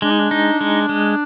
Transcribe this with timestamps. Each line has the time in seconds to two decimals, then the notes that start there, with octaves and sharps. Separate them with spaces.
0.02 G#3 D4
0.10 D#4
0.19 D4
0.31 D#4
0.61 G#3
0.89 G#3